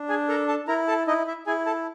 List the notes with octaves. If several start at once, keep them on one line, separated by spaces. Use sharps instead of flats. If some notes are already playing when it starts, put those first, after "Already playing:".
Already playing: D4
G#4 G#5
A4 A#4 A#5
A4 A5
E4 A#4 A#5
A4 A5
D#4 E4 D#5
E4 E5
E4 G#4 G#5
A4 A5